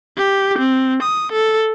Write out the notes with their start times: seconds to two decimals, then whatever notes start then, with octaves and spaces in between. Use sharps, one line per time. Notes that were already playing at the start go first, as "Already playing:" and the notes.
0.17 G4
0.58 C4
1.03 D#6
1.32 A4